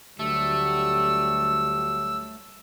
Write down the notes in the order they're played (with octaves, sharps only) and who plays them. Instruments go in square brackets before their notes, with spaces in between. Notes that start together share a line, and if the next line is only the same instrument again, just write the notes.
[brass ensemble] D2 F#3 G3 [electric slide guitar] A3 [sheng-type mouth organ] E6